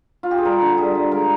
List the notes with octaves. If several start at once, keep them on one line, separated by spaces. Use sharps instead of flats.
F4
G4
G#4
G3 A#4
D3
G3 G#4
G3
G#3 A#4